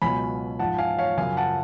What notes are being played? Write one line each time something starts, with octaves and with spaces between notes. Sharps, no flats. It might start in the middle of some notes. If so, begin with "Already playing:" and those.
C#2 B2 F#3 G#5 B5
G#2 F3 F#5 A5
F5 G#5
C#5 F5
F#2 C#3 F3 F5 G#5
F#5 A5